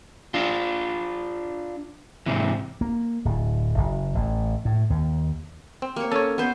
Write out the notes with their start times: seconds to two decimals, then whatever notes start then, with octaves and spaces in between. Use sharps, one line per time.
0.34 D4 F4
2.26 G#2 C3 E3
2.81 A#3
3.25 D1
3.78 F#1
4.15 A1
4.65 A2
4.90 D#2
5.82 C4
5.96 A#3 C#5
6.12 C#4 A4 C#5
6.38 B3 C5